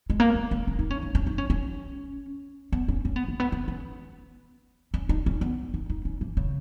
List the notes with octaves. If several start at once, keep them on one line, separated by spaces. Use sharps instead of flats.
G#3
A#3
C#4
C#4
C#4
D#4
C#4
D#4
C#4
D#4
C#4
C#4
B3
C#4
C#4
B3
A#3
B3
B3
C#4
C#4
D#4
C#4
B3
D#4
D#4
C#4
E3
C#3